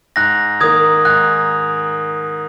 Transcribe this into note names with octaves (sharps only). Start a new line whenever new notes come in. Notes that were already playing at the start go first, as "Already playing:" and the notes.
G#2 F#6 A#6
D#3 A#3 D#6 G#6
G#2 F#6